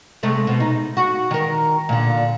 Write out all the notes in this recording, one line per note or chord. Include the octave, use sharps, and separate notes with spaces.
C3 G#3 A3
B2
D#4
F#4
D#3 A#4
A#2 D3